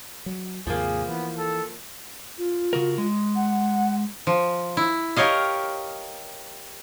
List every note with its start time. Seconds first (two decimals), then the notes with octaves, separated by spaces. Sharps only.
0.26 F#3
0.67 D#2 G#2 C3 F3 A#3 G#4
1.08 E3 B3
1.38 A4
2.38 F4
2.73 C#3 F#4 A#4
2.98 G#3
3.36 F#5
4.27 F3
4.77 E4
5.16 G4 A#4 C#5 D#5 F5